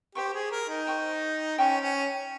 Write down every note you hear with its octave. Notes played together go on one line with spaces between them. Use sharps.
G4 C5 G5 C#6
G#4
A#4
D#4
C5 G5 C#6
C#4 C5 G5 C#6
C#4